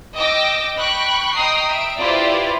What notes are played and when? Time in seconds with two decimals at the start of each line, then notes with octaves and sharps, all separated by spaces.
0.16 D#5 G5 D6 E6 A#6
0.76 G5 B5 C#6 F#6
1.33 D#5 G5 A#5 D#6 C7
1.68 E5 D7
1.99 E4 F4 G4 B4 C5 D5